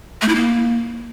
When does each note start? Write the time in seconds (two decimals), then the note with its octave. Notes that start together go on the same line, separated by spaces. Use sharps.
0.22 A3
0.29 E4
0.35 A#3